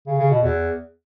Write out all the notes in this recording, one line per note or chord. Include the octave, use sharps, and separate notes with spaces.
C#3
C#3
B2
E2